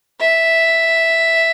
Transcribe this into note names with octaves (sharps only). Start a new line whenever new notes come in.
E5